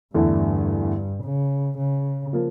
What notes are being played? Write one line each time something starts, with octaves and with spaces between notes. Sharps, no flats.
E2 G2 D3 A3 E4
C#3
C#3
F3 A#3